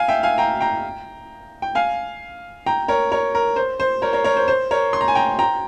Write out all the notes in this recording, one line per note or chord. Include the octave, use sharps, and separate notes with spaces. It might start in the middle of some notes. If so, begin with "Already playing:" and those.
Already playing: F5 G#5
E5 G5
F5 G#5
G5 A#5
G5 A#5
G5
F5 G#5
G5 A#5
A#4 C#5
A#4 C#5
A#4
C5
C5
A#4 C#5
A#4 C#5
A#4 C#5
C5
C5
A#4 C#5
C6
A#5
G#5
G5 A#5
G5 A#5